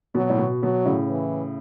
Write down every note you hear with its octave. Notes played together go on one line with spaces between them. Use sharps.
B2 F#3
A2
B2
B2 F#3
A2 C#3
E3